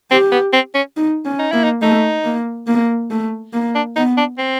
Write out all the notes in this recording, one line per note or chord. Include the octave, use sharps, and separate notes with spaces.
C4 G4
B3
C4
C#4
D#4
C#4
D#4
A#3 E4
D#4
A3 D#4
A#3
A#3
A3
A#3
D4
B3 D#4
D4
C4